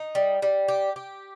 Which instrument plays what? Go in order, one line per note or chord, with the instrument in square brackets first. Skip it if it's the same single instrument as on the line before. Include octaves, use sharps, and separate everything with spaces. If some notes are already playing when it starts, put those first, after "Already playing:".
Already playing: [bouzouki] D#4
G3
G3
G4
G4